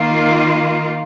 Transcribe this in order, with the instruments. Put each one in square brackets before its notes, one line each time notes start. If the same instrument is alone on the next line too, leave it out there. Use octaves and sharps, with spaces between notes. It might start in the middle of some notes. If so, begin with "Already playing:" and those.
Already playing: [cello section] D#3 A#3 F4